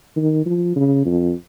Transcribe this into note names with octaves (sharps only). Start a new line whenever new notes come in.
D#3
F3
C#3
F2